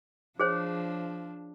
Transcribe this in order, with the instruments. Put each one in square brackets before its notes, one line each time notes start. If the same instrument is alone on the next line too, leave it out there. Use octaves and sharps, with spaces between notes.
[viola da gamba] F3 D4 [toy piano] G#4 C5 C#5